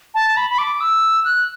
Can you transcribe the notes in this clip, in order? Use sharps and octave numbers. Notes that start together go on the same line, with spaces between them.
A5
B5
B5
D6
E6
F#6